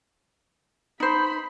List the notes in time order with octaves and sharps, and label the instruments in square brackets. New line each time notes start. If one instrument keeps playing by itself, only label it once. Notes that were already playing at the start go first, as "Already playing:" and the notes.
[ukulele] D#4 C5 [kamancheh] B5